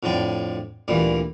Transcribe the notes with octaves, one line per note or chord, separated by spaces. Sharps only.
F2 A2 D3 D5 G5
D2 A#2 E3 G3